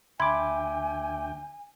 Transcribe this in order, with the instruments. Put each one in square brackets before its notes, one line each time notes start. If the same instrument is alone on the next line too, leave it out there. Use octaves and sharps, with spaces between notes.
[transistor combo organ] D2 G5 [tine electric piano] E5 D6 [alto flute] G#5 [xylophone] B5 C6 G#6